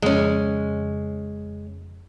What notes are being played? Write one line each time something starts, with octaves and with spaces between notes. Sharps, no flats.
F2 C#3 G#3 C#4